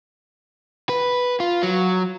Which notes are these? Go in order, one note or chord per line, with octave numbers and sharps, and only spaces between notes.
B4
F4
F#3